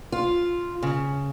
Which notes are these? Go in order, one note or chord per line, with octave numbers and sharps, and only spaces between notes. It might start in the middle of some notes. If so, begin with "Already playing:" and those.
F4
C#3